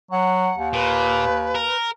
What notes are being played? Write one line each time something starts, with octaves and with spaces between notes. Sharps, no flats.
F#3 F#5
D#2
A#2 B4
A#4